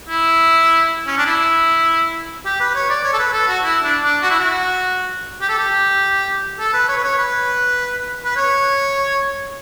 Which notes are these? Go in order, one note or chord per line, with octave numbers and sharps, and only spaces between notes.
E4
C#4
D4
E4
G4
B4
C#5
D5
C#5
A4
B4
A4
F#4
E4
D4
D4
F#4
E4
F#4
G4
A4
G4
A4
B4
C#5
B4
C#5
B4
B4
C#5